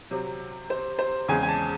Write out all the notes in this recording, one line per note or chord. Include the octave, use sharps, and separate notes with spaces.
C3 F#3 C4
C5
C5
E2 C#3 G#3 C4 G#5
G#5
A5